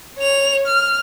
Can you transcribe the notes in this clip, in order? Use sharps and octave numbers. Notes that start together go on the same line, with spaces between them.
C#5 F7
F6